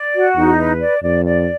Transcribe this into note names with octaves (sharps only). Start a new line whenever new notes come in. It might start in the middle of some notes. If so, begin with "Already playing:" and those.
Already playing: D5
F#4
E2 D#4
B4
D5
F2 D5
D5